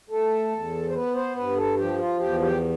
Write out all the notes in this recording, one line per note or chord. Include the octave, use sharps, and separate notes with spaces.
A3 A4
E2
C5
B3 B4
C5
G2 B4
A4
F3 G4
F4
E2 G4
G4